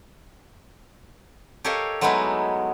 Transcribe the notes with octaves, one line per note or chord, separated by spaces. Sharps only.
G4 A4 A#4 C#5 D#5 F5
F#3 G#3 A3 B3 D#4 E4